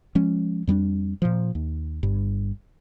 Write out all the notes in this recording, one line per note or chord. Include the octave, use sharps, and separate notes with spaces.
F3 G#3 C#4
F2 G3 B3 D4
A#2 F3
D#2
G1 G2